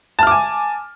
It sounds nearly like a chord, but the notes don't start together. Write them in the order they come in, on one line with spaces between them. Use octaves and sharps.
A5 F6 D6 G#5